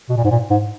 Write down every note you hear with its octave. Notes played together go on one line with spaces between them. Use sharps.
B2
A#2
G#2
A#2
G#2